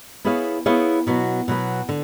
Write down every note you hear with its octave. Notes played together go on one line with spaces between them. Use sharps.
B3 E4 G#4 C#5 F5
B3 E4 G#4 C#5 F5
B2 F#3 B3
B2 F#3 B3
D3